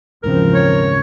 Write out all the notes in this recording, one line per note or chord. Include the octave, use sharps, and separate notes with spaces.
D#1 G#2 C#3 E3 F3 C4 A#4
C#5